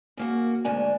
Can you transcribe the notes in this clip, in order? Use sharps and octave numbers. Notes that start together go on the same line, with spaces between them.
C#3 A#3 F#4
D2 G#2 D4 G#5